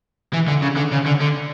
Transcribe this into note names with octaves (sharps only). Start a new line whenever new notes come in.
E3
D3
C#3
D3
C#3
D3
D3